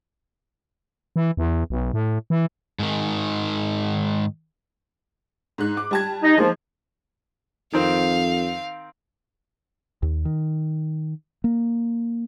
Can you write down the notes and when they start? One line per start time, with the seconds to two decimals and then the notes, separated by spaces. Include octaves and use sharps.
1.16 E3
1.37 E2
1.70 B1
1.93 A2
2.30 E3
2.79 G#2 D#3
5.58 G#2 G#3 F#6
5.77 D6
5.91 G3 A5 G#6
6.23 D#4 D#5
6.38 F3 A#3 D#4 G#4
7.73 F2 D#3 C4 F5
10.02 D#2
10.25 D#3
11.44 A#3